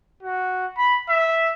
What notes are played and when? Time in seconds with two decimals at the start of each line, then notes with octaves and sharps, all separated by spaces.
0.23 F#4
0.78 B5
1.09 E5